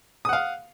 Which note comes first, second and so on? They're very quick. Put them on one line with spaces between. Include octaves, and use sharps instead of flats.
D#6 F#5 F5